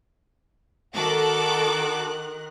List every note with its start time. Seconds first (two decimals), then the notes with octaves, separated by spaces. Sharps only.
0.94 D#3 F#4 A4 A#4 D6 F#6